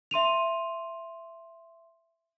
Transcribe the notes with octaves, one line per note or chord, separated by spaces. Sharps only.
E5 C6 D#7 F7